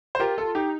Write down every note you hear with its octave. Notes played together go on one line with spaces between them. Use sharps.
C5
F4 G4 A#4
A4
D#4 G4